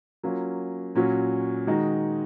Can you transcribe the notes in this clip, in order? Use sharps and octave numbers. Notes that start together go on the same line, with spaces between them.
F#3 A#3 C#4 F4
A#2 F#3 C#4 F#4
D#3 G#3 D#4 F#4